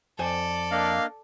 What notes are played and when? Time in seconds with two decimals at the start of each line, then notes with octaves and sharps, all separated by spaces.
0.19 F2 A4 C5 D5 G#5
0.71 A#3 D4 D#5 F5